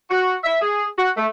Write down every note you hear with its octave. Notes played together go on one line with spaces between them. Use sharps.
F#4
E5
G#4
F#4
A3